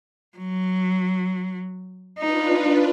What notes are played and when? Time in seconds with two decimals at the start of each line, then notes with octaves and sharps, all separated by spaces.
0.38 F#3
2.19 D4 D#4 F4 B4